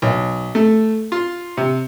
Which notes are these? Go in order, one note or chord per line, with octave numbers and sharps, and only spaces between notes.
B1
A3
F4
C3